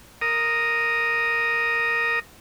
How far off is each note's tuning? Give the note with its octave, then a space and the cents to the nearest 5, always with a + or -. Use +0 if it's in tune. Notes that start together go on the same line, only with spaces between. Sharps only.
A#4 +0 D#6 +0